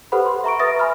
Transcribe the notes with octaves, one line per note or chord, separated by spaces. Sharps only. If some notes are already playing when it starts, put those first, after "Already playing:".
G4 A4 B4 C5 F#5 B5
C6
E5 A#5 C#6 D7
B4 E5 D#6 A6 A#6
G#5 B5 F6